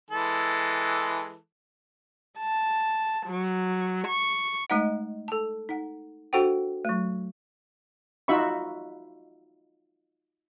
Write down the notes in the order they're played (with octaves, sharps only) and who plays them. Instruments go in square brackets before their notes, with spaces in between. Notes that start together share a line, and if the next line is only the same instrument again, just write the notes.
[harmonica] E3 G#3 A4
[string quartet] A5
F#3
C#6
[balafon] G#3 A3 D#4 D#5 F#5
A4 A5
D#4 F#5
D4 F#4 A4 C5 F#5 G5
F#3 A3
[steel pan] D#4 F4 F#4 E5 B5 C#6